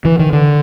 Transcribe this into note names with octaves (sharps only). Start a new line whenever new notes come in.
E3
D#3
D3